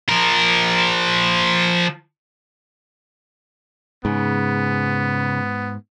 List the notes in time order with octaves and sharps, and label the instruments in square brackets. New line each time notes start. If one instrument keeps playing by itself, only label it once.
[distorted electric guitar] F3 A#4
[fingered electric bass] G#2 [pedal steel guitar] C#3 [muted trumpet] B3